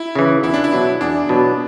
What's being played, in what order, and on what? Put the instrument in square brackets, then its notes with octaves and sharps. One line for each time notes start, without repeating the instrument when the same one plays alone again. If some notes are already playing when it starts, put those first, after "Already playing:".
Already playing: [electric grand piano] E4
[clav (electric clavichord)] C#3 E3
[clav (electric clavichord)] E2 [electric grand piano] E4
[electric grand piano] D4
E4
[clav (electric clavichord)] B2 F#3
[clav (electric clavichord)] E2 [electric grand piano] D4
[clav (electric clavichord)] B2 F#3